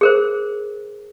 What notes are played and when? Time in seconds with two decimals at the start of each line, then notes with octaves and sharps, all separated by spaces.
0.01 G#4 A#4 C5